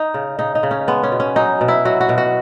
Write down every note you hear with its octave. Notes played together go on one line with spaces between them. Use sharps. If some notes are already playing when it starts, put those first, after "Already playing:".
Already playing: D#4
C#3
C#3 D#4
D#4
C#3
C#4
G#3 B3
C#4
B2
C#4
F#3 D#4
B2
E4
F#3 F#4
F#4
B2
F#4